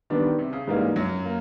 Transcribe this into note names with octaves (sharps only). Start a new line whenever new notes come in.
D#3 G3 B3 D4
C3
C#3
G#2 E3 G3 A#3 D#4
F#2 F#3
A#3